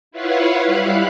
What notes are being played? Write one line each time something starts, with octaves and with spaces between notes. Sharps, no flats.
E4 F4 B4 C#5 F5 F#5
G3 E4 F5 B5 F#6